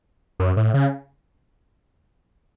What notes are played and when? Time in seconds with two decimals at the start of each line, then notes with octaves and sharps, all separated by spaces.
0.40 F#2
0.57 A2
0.74 C#3